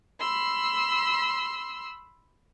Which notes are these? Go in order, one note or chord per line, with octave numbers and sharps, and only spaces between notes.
B5 C6 E6